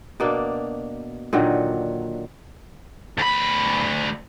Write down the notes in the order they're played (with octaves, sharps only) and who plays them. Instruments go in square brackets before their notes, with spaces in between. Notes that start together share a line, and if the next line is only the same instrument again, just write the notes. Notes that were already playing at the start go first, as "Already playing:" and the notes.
[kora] B2 A#3 D4
A#2 D3 D#3 F#3
[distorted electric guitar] D2 B5